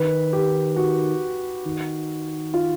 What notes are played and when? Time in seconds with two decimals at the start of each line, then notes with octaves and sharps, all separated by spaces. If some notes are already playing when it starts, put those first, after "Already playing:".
Already playing: D#3 B4
0.33 G4
0.76 F#4
1.65 D#3
2.54 F4